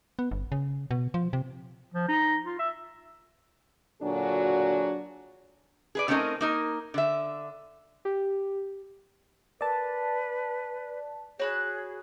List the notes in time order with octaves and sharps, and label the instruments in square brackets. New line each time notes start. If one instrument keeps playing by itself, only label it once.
[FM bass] B3
G1
C#3
B2
F3
C3
[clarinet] F3
D#4
F4
E5
[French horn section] A#2 D3 F#3 D4 F#4 G#4
[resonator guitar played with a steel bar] G#4 B4 D5
D3 A3 C4 C#4 D#4 A#4
A#3 D#4 A#4
D3 E5
[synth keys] G4
[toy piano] A#4 [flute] B4 [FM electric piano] D5 A5
[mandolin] F#4 B5 F#6 [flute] G#4 [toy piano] C#5